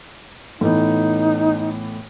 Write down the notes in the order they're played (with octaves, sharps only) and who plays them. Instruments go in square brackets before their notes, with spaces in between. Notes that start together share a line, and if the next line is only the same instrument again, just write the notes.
[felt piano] A2 E3 B3 [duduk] D#4